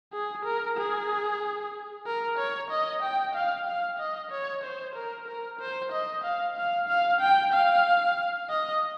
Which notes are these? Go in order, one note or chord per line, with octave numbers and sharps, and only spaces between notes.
G#4
A#4
G#4
A#4
C#5
D#5
G5
F5
F5
D#5
C#5
C5
A#4
A#4
C5
D#5
F5
F5
F5
G5
F5
D#5